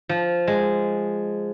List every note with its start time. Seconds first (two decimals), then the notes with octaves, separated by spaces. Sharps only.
0.09 F3
0.47 G#3